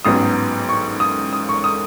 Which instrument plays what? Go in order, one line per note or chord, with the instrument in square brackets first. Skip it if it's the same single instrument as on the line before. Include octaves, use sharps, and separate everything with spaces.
[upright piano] A1 G#2 F#3 B3 D#6
C#6
D#6
D#6
C#6
D#6